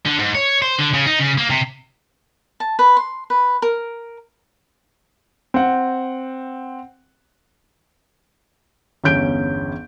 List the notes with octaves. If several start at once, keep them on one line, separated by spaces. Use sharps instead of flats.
D3
G#2
C#5
C5
D3
C#3
D#4
C#3
A#3
C3
A5
B4
C6
B4
A#4
C4 F#5
G1 E2 C#4 G6 D7